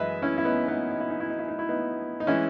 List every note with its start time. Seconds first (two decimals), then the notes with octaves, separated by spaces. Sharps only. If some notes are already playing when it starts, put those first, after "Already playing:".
Already playing: F#2 E3 G#3 B4 D#5 E5
0.22 C#4 E4
0.38 E4
0.45 B3 D#4
0.68 B3 D#4
0.91 D#4
1.00 E4
1.10 D#4
1.20 E4
1.30 D#4
1.39 E4
1.48 D#4
1.59 E4
1.69 B3 D#4
2.20 D#4
2.27 E3 G#3 C#4 E4